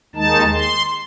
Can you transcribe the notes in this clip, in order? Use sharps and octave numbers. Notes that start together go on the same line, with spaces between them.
D#2 D#3 G#3 D#4 A5
C6